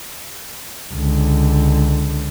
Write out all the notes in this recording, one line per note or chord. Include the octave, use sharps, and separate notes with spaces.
C#2 D3